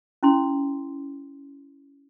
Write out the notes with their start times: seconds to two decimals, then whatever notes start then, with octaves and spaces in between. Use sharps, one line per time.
0.23 C#4 E4 C6